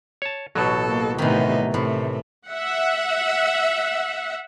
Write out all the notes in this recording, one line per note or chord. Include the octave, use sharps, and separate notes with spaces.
C#5 A5
A1 B2 F#3 A4
A#3
A2 C3 D#3 E3 B3 D#4
A2 C3 A3
E5 F#5